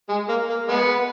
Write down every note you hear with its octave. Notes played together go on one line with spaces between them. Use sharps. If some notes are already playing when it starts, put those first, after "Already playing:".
G#3
A#3
A#3
G#3 B3